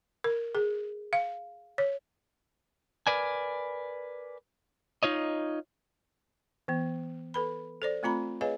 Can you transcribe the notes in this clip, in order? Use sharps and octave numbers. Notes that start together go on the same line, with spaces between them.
A#4
G#4
F5
C#5
A#4 B4 D5 G#5
D#4 F4 C#5 D#5
E3 B3
A4 B4 B5
A4 C5 D5
A3 C4 F4 A#5 B5
G#4 B4 C#5 D#5 F5 G#5